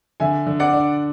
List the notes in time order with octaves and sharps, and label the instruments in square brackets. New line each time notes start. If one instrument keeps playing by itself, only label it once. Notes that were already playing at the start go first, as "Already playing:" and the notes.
[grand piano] D3 [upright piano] E5 G#5
[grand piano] D3
[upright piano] D5 F#5
[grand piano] D4